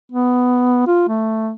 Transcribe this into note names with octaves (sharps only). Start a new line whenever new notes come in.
B3
F4
A3